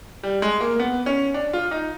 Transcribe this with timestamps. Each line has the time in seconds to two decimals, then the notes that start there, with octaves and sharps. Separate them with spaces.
0.23 G3
0.42 G#3
0.60 A#3
0.79 B3
1.06 C#4
1.34 D4
1.53 F4
1.71 D#4